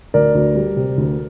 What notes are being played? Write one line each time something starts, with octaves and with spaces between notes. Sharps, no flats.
D2 A#4 D5
D2
G3
C3
D2